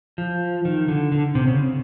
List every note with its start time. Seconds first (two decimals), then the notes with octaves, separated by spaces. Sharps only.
0.18 F3
0.65 D#3
0.88 D3
1.12 D3
1.35 C3
1.47 C#3